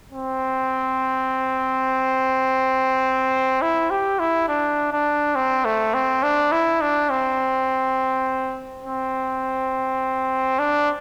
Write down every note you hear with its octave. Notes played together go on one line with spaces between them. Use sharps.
C4
E4
G4
E4
D4
D4
C4
A3
C4
D4
E4
D4
C4
C4
D4